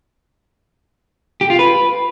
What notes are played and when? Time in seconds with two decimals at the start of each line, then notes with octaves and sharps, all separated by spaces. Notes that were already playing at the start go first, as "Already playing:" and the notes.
1.41 G4
1.50 F4
1.59 B4